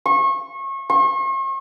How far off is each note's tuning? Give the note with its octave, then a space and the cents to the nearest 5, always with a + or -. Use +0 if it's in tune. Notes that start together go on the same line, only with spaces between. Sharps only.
C#6 -30
C#6 -45